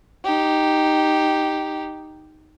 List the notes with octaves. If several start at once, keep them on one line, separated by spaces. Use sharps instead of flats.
D#4 G4